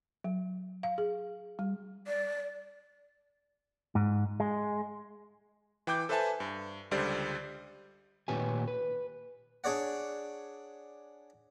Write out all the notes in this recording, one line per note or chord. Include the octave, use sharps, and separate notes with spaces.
F#3
F5
G#4
G3
D5
G#2
G#3
E3 G5 D6 G6
A4 B4 C5 E5 G#5 A5
G2
C#2 D3 G3 G4 C5 D5
D#2 A#2 G4 B4 C#5 G#5
B4
D4 G#4 C#5 D5 F#5